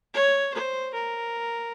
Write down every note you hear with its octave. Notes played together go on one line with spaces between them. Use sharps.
C#5
C5
A#4